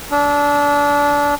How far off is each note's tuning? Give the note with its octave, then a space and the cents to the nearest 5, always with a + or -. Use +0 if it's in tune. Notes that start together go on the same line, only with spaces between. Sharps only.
D4 -25 E6 -30